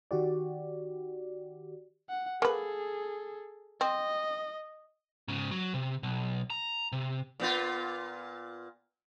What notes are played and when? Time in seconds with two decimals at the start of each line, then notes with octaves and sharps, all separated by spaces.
0.11 D#3 F#4 G4 D5
2.10 F#5
2.42 A#3 G#4 A4 B4
3.81 C4 D#5
5.28 G#2 C#3
5.51 F#3
5.74 C3
6.03 B1
6.50 A#5
6.92 C3
7.40 A#2 B3 F4